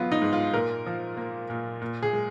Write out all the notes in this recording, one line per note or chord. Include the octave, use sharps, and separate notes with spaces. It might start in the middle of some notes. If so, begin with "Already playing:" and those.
Already playing: G#2 F#3 B3 F4
D#4
G#2
F4
A#2 A#4
F3
A#3
A#2
A#2
G#4
G#3